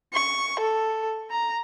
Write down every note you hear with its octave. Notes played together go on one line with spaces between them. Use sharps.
C#6
A4
A#5